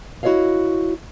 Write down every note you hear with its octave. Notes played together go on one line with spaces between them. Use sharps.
E4 F#4 A4 C#5 D#5 F5